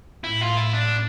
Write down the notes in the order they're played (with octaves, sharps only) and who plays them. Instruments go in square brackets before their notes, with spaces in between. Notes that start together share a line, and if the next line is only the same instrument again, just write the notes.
[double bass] A2 [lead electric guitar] E4
[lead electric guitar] F4
E4
D4